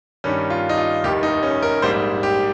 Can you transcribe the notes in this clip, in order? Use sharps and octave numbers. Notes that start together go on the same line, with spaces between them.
G2 D#3 G3 C#4
F4
D#4
F4
F1 D#2 D#3 G4
D#4
C#4
A#4
A#1 G#2 G3 A#3 C5
G4